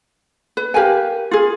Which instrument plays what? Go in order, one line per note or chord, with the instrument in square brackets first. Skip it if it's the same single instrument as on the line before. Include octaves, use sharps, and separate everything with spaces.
[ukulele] B4
G4 A#4 F5 G#5
F4 G#4